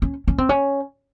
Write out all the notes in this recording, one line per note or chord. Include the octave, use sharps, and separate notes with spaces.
C#4
C#4
C4
C#4